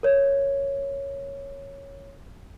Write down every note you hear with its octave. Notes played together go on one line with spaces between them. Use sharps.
A#4 C#5